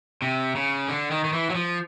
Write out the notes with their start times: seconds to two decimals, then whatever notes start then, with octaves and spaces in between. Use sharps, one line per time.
0.22 C3
0.55 C#3
0.88 D3
1.11 D#3
1.24 D#3
1.33 E3
1.50 F#3
1.55 F3